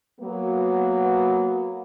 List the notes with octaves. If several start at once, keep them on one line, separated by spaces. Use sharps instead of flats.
F#3 A#3 B3